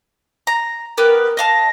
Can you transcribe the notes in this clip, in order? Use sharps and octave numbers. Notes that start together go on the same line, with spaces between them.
A#5
B3 G4 A#4 B4
D#5 F5 A5 A#6